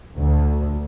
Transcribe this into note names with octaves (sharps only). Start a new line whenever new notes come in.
D2